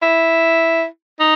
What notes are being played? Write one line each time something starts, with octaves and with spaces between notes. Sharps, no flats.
E4
D#4